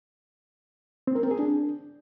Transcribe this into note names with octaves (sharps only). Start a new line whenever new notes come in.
C4
A#4
C4
G#4
D4